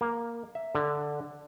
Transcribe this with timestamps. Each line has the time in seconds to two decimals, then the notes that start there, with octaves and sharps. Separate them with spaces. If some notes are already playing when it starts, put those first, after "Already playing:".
0.01 A#3
0.55 E5
0.75 D3